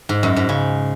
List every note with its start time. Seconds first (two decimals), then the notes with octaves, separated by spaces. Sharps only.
0.09 G#2
0.23 F#2
0.36 G#2
0.49 C#3